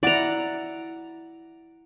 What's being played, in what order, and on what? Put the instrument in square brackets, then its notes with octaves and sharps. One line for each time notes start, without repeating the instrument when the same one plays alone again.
[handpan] E4 F#5 [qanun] D5 A#5